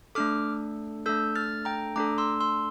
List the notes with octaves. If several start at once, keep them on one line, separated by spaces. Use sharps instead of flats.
A3 D4 A4 D6 F6
A3 D4 A4 E6 G6
F6 A6
G5 A#5
A3 D4 A4 A#5 D6
C6 E6
C6 E6